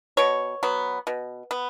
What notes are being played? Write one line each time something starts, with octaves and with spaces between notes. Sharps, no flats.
B2 C#5
F#3 B3
B2
B3